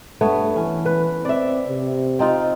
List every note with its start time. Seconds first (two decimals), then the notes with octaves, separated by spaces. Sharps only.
0.21 G2 A3 B3 C#5
0.56 E3 C#4
0.86 B4
1.25 C4 D5 E5
1.68 C3
2.19 C4 D#4 F4